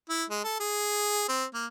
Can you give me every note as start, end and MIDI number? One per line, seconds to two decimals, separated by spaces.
0.10 0.24 64
0.30 0.43 56
0.44 0.57 69
0.60 1.26 68
1.29 1.45 60
1.54 1.66 58